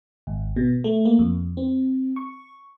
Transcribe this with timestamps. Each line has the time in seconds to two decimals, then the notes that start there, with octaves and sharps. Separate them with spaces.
0.27 G#1
0.56 B2
0.84 A3
1.05 A#3
1.19 F2
1.57 C4
2.16 C#6